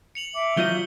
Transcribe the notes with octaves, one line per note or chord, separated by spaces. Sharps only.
C#7 F7 F#7
E5 D6
F#3 F4 D#5 G6 G7